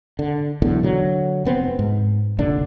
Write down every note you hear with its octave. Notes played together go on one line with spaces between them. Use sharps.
D3
B1 E2 A2 D3
D3 F#3
F1 B3 C4
G#2
F1 A#1 D3 D4